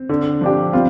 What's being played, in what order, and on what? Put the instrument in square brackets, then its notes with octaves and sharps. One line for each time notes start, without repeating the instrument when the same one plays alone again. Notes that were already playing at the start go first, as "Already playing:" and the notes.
Already playing: [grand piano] C4
[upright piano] D3
F3 D4 G4
[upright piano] G3 [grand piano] C4 F4